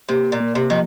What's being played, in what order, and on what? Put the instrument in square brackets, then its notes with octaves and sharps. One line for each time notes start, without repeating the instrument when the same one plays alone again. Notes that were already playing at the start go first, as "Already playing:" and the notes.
[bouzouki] C3 [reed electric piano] A#3
[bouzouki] A#2
[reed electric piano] A#3
[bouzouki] C3
[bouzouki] D#3 [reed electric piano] F3